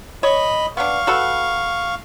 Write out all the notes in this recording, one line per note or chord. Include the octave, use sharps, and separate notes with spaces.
C#5 D#5 B5
B3 D4 F5 C#6
F#4 A4 B4